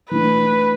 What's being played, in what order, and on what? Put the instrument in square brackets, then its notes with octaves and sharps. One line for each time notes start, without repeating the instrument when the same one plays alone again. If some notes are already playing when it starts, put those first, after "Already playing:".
[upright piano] E3 A3 D4 [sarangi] B4